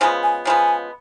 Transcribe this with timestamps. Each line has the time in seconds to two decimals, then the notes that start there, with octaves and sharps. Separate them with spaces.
0.01 C#3 F3 G#3 B3 G#5
0.23 G#5
0.45 C#3 F3 G#3 B3 G#5